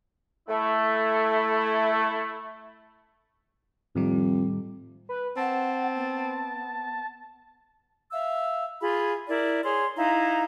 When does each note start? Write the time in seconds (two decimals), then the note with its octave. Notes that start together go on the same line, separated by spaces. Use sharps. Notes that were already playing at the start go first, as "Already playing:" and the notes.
0.49 A3 E4
3.95 F2 A2 D#3 G3
5.09 B4
5.37 C4 F#5 A5
5.95 B3
8.12 E5 F5 E6
8.81 F4 G#4 B5
9.28 E4 A#4 D5
9.64 G#4 C#5 C6
9.97 D#4 E4 F5 A#5